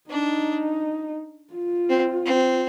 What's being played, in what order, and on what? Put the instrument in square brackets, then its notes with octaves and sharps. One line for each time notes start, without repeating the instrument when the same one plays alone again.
[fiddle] D4 [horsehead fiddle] D#4
[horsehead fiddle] F4
[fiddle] C4
C4